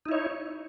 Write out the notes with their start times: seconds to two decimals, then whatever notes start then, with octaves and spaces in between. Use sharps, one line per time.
0.06 D#4
0.09 E4
0.12 C#5